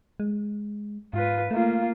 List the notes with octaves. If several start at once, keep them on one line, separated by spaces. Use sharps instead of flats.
G#3
G#2 F4 B4
A3 A#3 F4